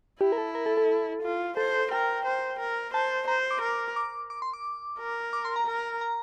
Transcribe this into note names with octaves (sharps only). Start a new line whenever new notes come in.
E4 G4
A#4
A4
A#4
A4
A4
F4
A4 C5
A#4 G5
C5
A#4
C5 A5
C5 A#5
C6
D6
A#4
D6
D6
C6
D6
A#4
D6
C6
A#5
A#4
A#5